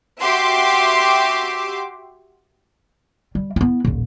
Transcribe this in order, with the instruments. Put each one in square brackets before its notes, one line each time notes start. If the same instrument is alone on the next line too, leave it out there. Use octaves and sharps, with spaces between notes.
[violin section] F#4 G4 E5 C6 D6
[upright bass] G3
B3 E4
D#1 A1